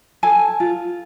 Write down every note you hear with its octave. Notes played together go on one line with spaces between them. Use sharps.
A4 G#5
F4